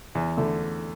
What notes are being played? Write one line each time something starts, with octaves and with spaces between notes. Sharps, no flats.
E2
D3 A3 E4